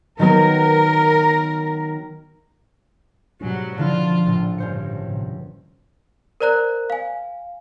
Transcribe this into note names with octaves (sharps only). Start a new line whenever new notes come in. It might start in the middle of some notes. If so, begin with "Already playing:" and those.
D#3 F#3 B3 A#4
G#2 B2 F#3 G3 C#4
D3 F3 E4 F4
A#1 A2 C#3
G2 C#4 C5 C#7
A2 C3
A#4 C5 D5 A#5 F#6
F5 G#5